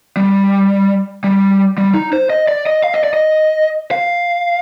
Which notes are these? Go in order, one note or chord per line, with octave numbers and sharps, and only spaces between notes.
G3
G3
G3
D#4
C5
D#5
D5
D#5
F5
D#5
D5
D#5
F5